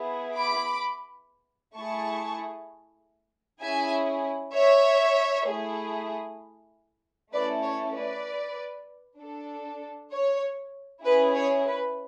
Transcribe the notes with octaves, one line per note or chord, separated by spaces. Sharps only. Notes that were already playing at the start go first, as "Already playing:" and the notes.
Already playing: B3 E4 G#4
B5 D6
A3 E4 G#4 A5 C#6
C#4 E4 G#4 E5 G#5
C#5 E5
A3 E4 G#4
A3 C#4 E4 A4 B4 D5
C#5
B4 D5
D4 A4
C#5
C#4 E4 G#4 B4
C#5
B4